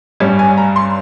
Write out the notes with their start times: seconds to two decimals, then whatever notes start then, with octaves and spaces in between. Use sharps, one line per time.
0.20 G2 G3 C#4
0.39 G#5
0.58 A#5
0.76 C6